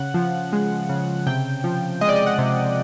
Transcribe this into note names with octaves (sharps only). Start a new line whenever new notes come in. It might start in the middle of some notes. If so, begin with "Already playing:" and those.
Already playing: C#3 F#5
F3
G#3
C#3
C3 G5
F3
G#3 D#5
D5
D#5
F#5
C3